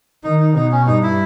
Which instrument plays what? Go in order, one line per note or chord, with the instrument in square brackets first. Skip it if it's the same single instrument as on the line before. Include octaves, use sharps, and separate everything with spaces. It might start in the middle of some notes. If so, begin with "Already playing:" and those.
[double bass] D#3 [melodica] D#4
[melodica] D#4
[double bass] B2 [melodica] D#4
[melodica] C#4
[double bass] G2 [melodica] D#4
[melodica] E4